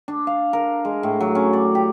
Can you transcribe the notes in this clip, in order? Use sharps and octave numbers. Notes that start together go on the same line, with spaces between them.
D4
F5
A#4
G#3
A2
F#3
C#4
D5
G4